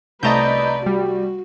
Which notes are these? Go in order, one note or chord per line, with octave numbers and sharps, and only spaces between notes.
C2 A3 B4 D5 D#5 A5 A#5 G6
G3 F#4